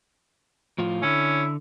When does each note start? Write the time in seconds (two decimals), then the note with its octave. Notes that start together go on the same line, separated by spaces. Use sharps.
0.78 A2 F3 F4
1.03 D3 C#4 E4